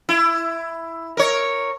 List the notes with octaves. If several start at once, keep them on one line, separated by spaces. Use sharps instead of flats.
E4
A#4 C#5